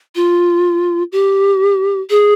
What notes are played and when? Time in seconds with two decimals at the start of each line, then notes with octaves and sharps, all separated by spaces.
0.16 F4
1.12 G4
2.10 G#4